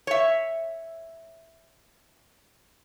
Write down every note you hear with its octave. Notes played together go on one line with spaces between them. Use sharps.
C#5 E5